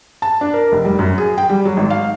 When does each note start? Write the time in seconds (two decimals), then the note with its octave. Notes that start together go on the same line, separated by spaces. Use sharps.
0.22 A5
0.41 D4
0.54 A#4
0.72 F1
0.85 G3
0.99 F#2
1.18 G#4
1.38 G5
1.50 G3
1.65 F#3
1.77 G#1
1.90 F5